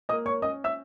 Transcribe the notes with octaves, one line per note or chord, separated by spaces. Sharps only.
A#3 D#5 D#6
C#5 C#6
C#4 D#5 D#6
E5 E6